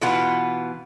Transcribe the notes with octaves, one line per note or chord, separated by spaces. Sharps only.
B2 E3 B3 F4 F#5